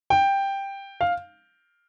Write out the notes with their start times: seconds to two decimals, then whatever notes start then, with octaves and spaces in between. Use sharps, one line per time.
0.10 G5
1.01 F5